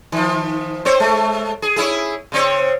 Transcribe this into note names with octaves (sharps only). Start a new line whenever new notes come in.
D#3 F3
C4 C5 C#5
G#3 A3
G#4
C#4 E4 G#4
C#3 C4 C#5